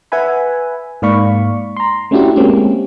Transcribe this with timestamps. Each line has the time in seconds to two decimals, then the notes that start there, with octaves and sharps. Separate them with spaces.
0.12 B4 E5 F#5 G#5 B5
1.02 G#2 A#3 D5 F5 B5 C#6
1.76 A#5 C6
2.11 A3 C#4 D4 E4 F#4 G4
2.36 G#3 A#3 C4 C#4 G4